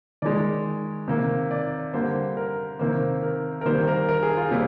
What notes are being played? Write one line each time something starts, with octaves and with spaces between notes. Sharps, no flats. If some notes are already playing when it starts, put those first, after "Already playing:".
D#3 G#3 D5
C3 D#3 A#3
D5
D3 G3 A#3 C5
A#4
C3 D#3 A#3 C5
A#4
A#4
D#3 G3 A#3 C5
A#4
A#4
G#4
F4
C3 G3 A#3